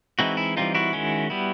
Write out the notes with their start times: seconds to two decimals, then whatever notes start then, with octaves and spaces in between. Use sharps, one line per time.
0.19 E3 G#3 C4 D#4 E4 F#4
0.37 E4
0.57 E3 G3 C4 D#4 F4
0.75 E4 F#4
0.93 D#3 G#3 C#4
1.30 G3 B3 E4